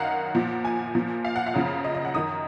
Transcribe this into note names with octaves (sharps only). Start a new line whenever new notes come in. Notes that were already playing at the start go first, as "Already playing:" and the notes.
Already playing: F#2 D#3 F5 F#5
A#2 F3
G#5
A#2 F3
F5
F#5
F5
F#2 C#3 F3
D#5
D#5
F#5
F#2 D#3 D#6